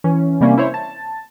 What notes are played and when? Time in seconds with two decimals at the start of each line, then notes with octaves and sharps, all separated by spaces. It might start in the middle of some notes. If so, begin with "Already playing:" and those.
0.04 E3 C#4
0.40 C3 G3 A#3 C#4
0.57 E4 C5 C#5
0.74 A5